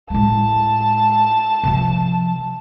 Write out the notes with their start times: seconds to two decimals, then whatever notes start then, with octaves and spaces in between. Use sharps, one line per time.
0.10 A2 G#3 A5
1.63 C3 F3